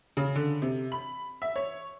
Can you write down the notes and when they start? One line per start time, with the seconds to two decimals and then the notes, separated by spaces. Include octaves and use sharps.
0.17 C#3
0.36 D3
0.62 C3
0.92 B5
1.42 E5
1.56 C#5